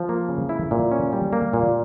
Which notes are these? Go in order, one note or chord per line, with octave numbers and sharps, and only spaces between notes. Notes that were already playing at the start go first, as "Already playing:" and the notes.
Already playing: F3
A#3
C#3
E4
A#2
C#4
G3
A#3
A#2